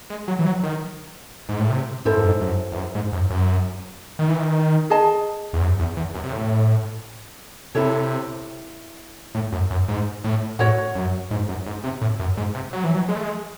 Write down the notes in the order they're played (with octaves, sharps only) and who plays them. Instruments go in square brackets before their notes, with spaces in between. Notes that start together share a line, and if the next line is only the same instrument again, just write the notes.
[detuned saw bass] G#3
F#3
E3
F#3
D#3
G#2
A2
C3
[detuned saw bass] G#2 [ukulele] E4 A4 C5
[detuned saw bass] F#2
G#2
F#2
E2
F#2
G#2
F#2
F#2
D#3
E3
D#3
[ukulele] G#4 D#5 A5
[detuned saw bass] E2
F#2
E2
E2
F#2
C3
A2
[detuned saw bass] C3 [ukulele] E4 A4 C#5
[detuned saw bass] A2
F#2
F#2
G#2
A2
[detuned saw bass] A2 [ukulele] F#4 C#5 F#5
[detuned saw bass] F#2
G#2
F#2
G#2
C3
A2
F#2
G#2
C3
F#3
E3
F#3
G#3
A3
G#3